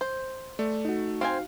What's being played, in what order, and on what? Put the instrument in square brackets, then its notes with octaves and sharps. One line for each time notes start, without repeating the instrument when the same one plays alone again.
[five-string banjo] C5
[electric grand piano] A3 [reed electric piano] D5
[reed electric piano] D#4 F#4
[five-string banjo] C4 C5 G#5 [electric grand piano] F5